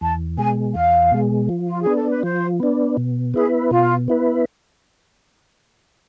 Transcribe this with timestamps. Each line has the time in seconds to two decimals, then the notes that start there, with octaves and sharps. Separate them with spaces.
0.01 E2 A5
0.38 B2 G#3 G#5
0.75 E2 F5
1.12 B2 G#3
1.49 F3
1.68 F4
1.82 B3 D4 G#4
1.95 A4
2.09 B4
2.23 F3 C5
2.60 B3 D4
2.97 B2
3.34 B3 E4 G#4 B4
3.71 B2 F4
4.08 B3 E4 B4